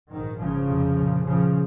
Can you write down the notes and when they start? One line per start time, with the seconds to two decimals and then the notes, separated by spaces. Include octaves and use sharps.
0.11 A#1 G#2 D#3
0.39 G#1 G2 C#3 F3
0.68 F1 F2 C3
0.96 A#1 A#2
1.24 A#1 A#2 C#3 F3